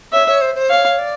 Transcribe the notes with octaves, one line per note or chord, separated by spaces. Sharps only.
C#5 E5
C#5
C5
C5
C#5 F5
D5